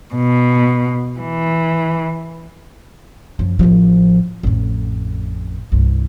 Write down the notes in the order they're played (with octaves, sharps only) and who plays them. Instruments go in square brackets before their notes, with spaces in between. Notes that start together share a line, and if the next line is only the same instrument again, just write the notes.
[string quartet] B2
E3
[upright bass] F#2 F3
A1 F3
A1 F2
C2 G2